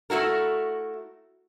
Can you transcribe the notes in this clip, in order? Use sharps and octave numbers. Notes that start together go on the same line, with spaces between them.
A3 E4 F#4 A#4